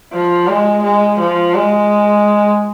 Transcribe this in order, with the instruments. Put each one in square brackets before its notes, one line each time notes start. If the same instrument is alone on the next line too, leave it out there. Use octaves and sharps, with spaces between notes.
[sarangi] F3
G#3
G#3
F3
G#3